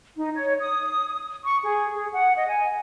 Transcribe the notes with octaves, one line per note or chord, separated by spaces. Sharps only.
D#4
C#5
D#6
C#6
G#4
G#4
F#5
D#5
G#5